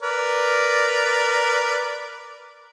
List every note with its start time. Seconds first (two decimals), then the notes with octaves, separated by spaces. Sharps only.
0.02 A#4 B4 D5